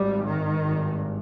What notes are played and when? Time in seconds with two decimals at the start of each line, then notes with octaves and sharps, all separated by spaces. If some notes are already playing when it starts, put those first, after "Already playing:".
Already playing: G#1 G#2 G3
0.24 D#3
0.62 G#1 G2